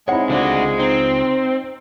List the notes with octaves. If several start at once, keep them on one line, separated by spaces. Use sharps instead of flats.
G#3 C4 D#4 E4 C#5 F#5
C#2 D3 D4 F4 F#4 C5
C4 D#4